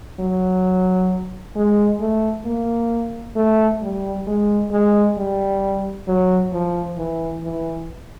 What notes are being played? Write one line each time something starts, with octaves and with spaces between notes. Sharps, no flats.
F#3
G#3
A3
A#3
A3
G3
G#3
G#3
G3
F#3
F3
E3
E3